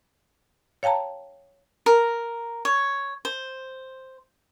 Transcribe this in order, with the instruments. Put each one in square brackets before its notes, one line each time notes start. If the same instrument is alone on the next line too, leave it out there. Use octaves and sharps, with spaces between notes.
[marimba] C#5 F5 G5 A5 A#5
[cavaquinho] A#4
C#5
C5